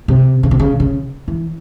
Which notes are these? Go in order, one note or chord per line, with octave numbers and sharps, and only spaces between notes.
C3
C#3
C3
C#3
C#3
E3